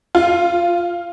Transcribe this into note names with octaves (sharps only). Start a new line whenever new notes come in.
F4